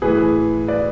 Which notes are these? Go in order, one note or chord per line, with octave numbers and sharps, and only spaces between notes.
A2 E3 G#4 B4
B4 D5